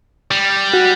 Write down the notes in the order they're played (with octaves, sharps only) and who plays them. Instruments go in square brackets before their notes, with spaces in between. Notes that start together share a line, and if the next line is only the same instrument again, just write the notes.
[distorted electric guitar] G3
[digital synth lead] F#4